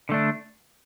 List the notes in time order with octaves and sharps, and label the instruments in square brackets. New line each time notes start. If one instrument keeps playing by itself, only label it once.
[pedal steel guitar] D3 A3 D4